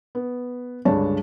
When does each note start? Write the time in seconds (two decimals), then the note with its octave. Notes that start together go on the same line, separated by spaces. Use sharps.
0.15 B3
0.85 C#2 G2 D3 D4 C#5 A5